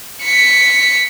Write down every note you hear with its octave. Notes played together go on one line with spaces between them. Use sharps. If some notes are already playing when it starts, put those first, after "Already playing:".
B6 C#7